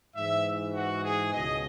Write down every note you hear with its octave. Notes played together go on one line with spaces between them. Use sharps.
G#2 E3 E5
F#4
G#4
C#2 B2 D#5